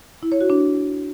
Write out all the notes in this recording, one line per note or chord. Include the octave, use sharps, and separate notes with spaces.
E4
C#5
F#4
D4